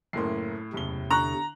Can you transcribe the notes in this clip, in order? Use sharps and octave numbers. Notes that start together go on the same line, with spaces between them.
F#1 A2 A#3 E4 C6 C7
F#1 E2 C3 G7
D3 A#5 C#6 F#6